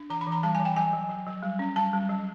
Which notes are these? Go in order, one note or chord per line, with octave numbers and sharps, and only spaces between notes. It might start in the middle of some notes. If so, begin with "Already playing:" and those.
Already playing: D4
E3 A#5
B5
E3
A#5
G3 A5
G#5
E3
G5
F#3 G#5
F#3
F#3
F#3
G3
C#4
G3 A5
G3
F#3